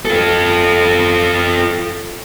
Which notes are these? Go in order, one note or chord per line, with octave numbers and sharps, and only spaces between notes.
F4 A4